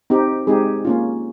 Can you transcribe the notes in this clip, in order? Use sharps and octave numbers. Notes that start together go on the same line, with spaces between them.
C4 D#4 G4
G#3 C4 D#4 G4 G#4
A#3 C#4 F4